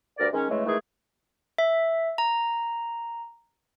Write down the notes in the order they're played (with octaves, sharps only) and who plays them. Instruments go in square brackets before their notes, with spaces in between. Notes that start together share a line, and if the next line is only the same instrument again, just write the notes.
[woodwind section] D2 G2 A#4 D5
D#3 G#3 C#4
C#3 E3 G#3 A3
D#3 E3 G#3 A3 G#4
[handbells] E5
A#5